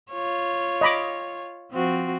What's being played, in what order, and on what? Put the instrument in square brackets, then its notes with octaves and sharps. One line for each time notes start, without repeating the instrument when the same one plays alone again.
[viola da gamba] F4 C#5
[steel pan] D#5 B5 D6
[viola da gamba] F3 C4 F#4